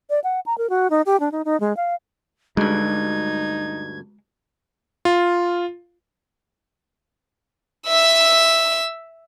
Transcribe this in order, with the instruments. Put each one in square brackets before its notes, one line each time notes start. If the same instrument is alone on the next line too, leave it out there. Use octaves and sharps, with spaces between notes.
[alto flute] D5
F#5
A#5
A#4
F#4
D#4
G4
D4
D#4
D#4
G#3
F5
[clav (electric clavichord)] D2 G2 [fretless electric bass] G#3 [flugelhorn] D#4 [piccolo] G#6
[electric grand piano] F4
[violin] E5 E6